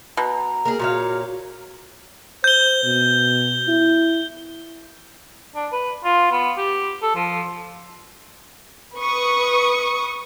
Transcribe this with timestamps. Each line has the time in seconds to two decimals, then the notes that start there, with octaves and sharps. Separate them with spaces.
0.17 B2 A#5
0.65 A#3 G#4 A#4
0.79 A#2 F#4 C#5 F5
2.44 C5 G6 G7
2.84 B2
3.68 E4
5.55 D4
5.72 B4
6.04 F4
6.32 B3
6.57 G4
7.02 A4
7.16 F3
8.97 B4 C#6 D#6